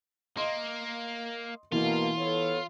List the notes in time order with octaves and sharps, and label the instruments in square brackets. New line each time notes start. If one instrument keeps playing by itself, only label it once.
[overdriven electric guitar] A#3 [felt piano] D#5 C6
[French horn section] B2 A#3 [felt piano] E3 [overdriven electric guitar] F4
[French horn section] B3 A4 C#5